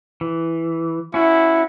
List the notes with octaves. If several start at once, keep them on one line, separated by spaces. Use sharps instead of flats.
E3
C#4 E4 F#4